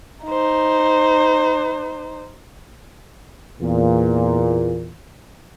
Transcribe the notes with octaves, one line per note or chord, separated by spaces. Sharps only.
D#4 C5
E2 A#2